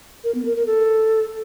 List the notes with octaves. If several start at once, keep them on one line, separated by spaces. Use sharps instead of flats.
A#4
B3
A#4
A#4
A4